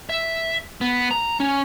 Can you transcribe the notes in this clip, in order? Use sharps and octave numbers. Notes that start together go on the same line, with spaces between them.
E5
B3
A#5
C#4